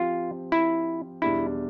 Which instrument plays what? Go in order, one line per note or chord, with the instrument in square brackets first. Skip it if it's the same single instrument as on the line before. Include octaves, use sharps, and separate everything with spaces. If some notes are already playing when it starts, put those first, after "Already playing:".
Already playing: [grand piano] F3 C4 G4 [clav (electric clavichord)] F4
[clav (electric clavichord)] E4
[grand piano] E2 B2 G3 D4 [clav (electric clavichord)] E4